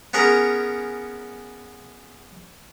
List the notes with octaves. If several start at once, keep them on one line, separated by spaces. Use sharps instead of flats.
B3 C#4 G#4 A#4